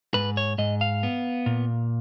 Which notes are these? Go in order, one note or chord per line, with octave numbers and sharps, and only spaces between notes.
G#2 B4
C#5
G#2 D#5
F5
B3
A#2